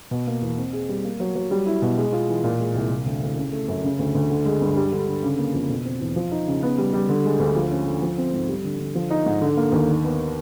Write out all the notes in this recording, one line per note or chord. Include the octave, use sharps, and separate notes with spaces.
B2
A#3
E2
C4
G#4
G3
A#3
F#3
F#3
G3
E4
B2
G#3
F4
E3
A#2
G#3
C2
C3
D2
D2
C#3
A3
F#2
C#3
D2
D2
D3
G#3
G2
G3
D3
D3
C#3
A#3
F2
B2
C4
E2
F3
D#4
C#3
B3
G3
G3
D3
G#3
D2
F3
C#4
D3
F3
C4
G#2
G3
D3
D3
F3
D#4
G#2
D3
A#3
D#2
D#3
B3